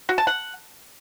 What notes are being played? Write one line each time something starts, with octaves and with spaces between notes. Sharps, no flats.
F#4
A5
F#5